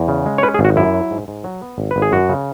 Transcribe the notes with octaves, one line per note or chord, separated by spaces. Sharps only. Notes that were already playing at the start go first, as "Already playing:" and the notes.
Already playing: E2
C#3
G#3
C#5
C#4 B4
G#4
G#1
F#4
F#2 E4
F#3
G#2
G#2
F#3
B3
G#1
B4
G#1
G#4
F#2 F#4
C#3